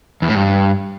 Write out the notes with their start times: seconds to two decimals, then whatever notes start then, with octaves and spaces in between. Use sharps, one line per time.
0.22 E2
0.29 A2
0.35 G2